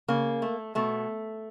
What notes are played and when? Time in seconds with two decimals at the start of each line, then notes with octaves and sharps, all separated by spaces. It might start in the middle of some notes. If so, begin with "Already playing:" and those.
0.08 C#3 A#3
0.42 A3
0.75 B2 A3